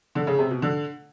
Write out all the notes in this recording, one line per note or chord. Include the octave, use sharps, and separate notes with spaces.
D3
C#3
C3
B2
D3